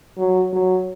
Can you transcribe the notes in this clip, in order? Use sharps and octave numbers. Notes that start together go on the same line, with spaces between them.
F#3
F#3